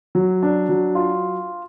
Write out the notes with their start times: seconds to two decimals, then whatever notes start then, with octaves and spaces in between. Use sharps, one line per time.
0.15 F#3
0.43 D4
0.69 F#3
0.95 F4